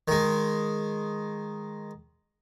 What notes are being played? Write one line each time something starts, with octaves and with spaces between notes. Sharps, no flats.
D#3 G#3